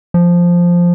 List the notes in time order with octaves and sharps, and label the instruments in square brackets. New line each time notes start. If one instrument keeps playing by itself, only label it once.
[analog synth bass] F3